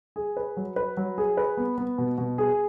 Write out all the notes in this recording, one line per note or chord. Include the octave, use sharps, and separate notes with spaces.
G#4
B4
F#3
B4
F#3
G#4
B4
B3
B3
B2
B2
G#4